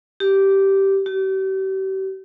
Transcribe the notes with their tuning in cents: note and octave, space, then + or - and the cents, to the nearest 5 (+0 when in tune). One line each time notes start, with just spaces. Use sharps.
G4 -10
G4 -40